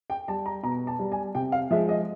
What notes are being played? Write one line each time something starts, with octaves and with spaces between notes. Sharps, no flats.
G5
G3 A5
A#5
B2 A#5
A5
G3
G#5
C3 G5
F5
F3 G#3 E5
D#5